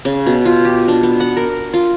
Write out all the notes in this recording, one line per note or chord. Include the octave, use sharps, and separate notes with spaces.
C#3
B2
F4
G4
D4
B3
F#5
A#4
F4